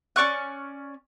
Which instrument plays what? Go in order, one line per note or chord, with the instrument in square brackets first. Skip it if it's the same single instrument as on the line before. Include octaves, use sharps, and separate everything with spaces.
[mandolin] C#4 D5 C#6 F#6